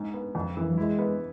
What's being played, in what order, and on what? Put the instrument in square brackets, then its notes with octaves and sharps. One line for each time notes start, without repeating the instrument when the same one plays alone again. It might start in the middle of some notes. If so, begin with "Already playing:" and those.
Already playing: [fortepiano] G#2
B3
F2
E3
[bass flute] F3
[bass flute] G#3 [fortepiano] E4
[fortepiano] B3